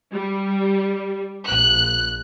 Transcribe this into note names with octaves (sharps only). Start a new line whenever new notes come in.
G3
A#1 F#6